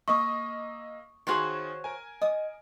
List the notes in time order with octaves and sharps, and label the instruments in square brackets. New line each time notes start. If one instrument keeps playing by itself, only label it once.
[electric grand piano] A#3 D#5 E5 [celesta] C#6 D#6
[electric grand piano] D#3 F4 G#4 [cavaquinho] F#4 C5 C#5
[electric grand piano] A#4 G#5
[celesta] D#5 [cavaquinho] D#6